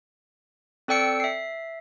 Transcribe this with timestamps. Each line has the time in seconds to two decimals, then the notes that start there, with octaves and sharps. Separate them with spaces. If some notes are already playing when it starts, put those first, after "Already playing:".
0.88 C4 A4 D5 G5 E6 C#7
1.20 E5 C7